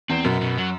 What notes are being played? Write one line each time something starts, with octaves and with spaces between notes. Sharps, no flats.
E2 C4
F#2 B2
B2
F#3